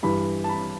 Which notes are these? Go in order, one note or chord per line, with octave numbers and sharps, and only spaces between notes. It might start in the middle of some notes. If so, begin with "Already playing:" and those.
G2 E3 B5
A5
B5